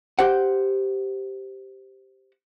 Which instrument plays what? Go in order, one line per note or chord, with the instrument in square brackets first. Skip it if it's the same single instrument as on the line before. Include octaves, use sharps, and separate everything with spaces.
[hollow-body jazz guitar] G4 C5 F#5